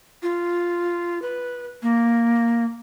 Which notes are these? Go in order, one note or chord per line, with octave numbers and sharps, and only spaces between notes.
F4
B4
A#3